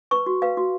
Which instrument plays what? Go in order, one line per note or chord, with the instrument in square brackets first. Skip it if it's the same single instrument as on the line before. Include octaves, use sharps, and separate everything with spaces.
[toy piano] B4 C#6
F#4
B4 F5
F#4